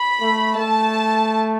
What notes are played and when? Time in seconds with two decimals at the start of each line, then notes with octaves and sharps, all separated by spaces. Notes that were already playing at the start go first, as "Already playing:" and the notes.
Already playing: B5
0.21 A3
0.57 A3 A5